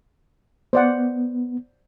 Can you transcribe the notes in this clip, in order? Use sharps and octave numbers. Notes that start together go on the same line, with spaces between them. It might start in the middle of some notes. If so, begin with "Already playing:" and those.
B3 C5 D5 F#5